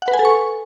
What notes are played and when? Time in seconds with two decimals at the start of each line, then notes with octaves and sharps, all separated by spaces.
0.02 F#5
0.08 B4
0.13 G#5
0.19 A4
0.25 C#6